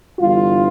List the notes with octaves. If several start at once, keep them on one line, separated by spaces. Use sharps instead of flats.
G1 G2 E3 F4